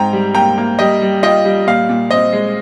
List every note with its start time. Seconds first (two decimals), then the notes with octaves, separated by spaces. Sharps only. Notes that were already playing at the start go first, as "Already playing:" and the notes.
Already playing: G#2 C4 G5 A#5
0.13 G3
0.35 A#3 G5 A#5
0.58 A#3
0.79 G3 D#5 G5
1.02 G3
1.23 F4 D#5 G5
1.45 G3
1.67 A#2 F5
1.89 A#2
2.11 C4 D#5
2.33 G#3